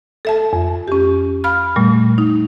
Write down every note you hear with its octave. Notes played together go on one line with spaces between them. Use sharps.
A4 E5 A5
F2
C#4 G4
F5 B5 F6
A#2 G3 A3
D#4